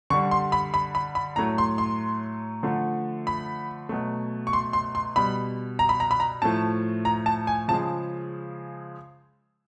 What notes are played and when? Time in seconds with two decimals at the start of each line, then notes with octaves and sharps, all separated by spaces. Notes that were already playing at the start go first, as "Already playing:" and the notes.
0.10 D3 G3 C#6
0.31 C6
0.52 B5
0.74 B5
0.95 B5
1.15 B5
1.36 A2 F#3 A3 A#5
1.58 C6
1.78 C6
2.63 D3 F3 A3
3.27 B5
3.89 B2 F#3 A3
4.47 C#6
4.53 C6
4.73 C6
4.95 C6
5.16 B2 G3 B5
5.79 A#5
5.89 B5
6.00 A#5
6.11 B5
6.20 A#5
6.42 A2 F3 A3 A5
7.05 A#5
7.26 A5
7.47 G#5
7.68 C#3 F3 G#3 A5